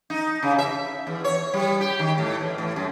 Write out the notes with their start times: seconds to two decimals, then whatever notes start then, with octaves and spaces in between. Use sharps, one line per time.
0.10 D#4
0.43 C#3
0.58 E5
1.07 E2
1.24 C#5
1.54 G3
1.80 G4
1.99 D#3
2.18 A2
2.41 E2
2.58 A2
2.76 F#2